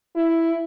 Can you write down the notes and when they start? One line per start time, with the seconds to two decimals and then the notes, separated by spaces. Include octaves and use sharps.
0.15 E4